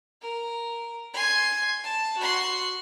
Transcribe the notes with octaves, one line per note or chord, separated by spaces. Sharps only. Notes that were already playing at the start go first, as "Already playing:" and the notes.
A#4
G#5 C6
A5
F#4 C6